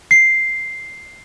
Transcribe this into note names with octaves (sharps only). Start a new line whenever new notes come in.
C7